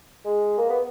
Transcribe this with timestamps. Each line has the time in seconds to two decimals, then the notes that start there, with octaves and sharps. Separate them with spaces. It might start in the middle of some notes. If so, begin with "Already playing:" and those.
0.25 G#3
0.58 A#3
0.70 B3